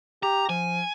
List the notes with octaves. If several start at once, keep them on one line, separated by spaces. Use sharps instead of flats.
G4 A#5
F3 G#5